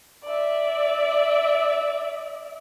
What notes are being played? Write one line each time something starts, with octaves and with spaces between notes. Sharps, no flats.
D5 E5